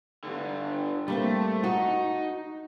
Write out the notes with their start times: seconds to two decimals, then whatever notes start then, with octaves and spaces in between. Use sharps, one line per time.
0.24 G2 D3
1.08 G3 A3 A#3 C4
1.64 D#4 F#4